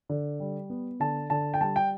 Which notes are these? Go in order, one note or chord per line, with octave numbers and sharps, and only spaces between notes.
D3
G3
B3
D3 A5
D3 A5
G5
G3 A5
G5